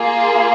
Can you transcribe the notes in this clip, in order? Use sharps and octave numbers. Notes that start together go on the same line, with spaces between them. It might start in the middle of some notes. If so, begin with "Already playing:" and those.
Already playing: A#3 F4 G#4